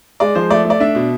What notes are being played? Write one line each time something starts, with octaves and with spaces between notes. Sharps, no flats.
G#3 D5
F3 C5
A3 D5
A3
D5
D4 E5
B2